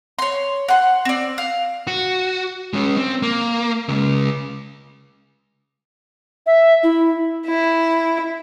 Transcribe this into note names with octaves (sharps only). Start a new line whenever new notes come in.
C#5 C6
F#5 C6
C4 D5
F5
F#4
G#3 C#4
C4
A#3
C#3 G#3
E5
E4
E4